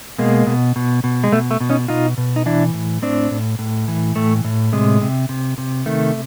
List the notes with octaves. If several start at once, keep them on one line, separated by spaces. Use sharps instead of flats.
B2 G#3 A#3
B2
B2
B2
G#3
B2 A3
A3
B2
C#4 D#4
B2 D#4 F4
B2
D#4
E3 D4 E4
A2
A2 C4 D4
A2
A2
E3
A2 A3
A2
C3 G#3
C3
C3
C3
D#3 A3